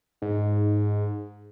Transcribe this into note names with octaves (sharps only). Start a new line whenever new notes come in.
G#2